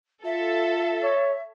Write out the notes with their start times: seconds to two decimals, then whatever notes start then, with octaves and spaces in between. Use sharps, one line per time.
0.25 F4 A4 E5
1.03 C#5